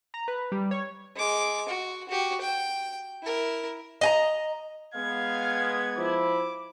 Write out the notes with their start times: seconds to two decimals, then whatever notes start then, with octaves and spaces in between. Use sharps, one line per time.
0.14 A#5
0.28 B4
0.52 G3
0.71 C#5
1.16 G#3 D6
1.69 F#4
2.09 F#4 G4
2.41 G5
3.23 E4 A#4
4.01 D#5 G#5 A#5
4.95 G#3 B3 F5 G#6
5.97 F3 E4 D6